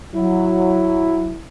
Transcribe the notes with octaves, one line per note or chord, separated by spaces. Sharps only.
F#3 E4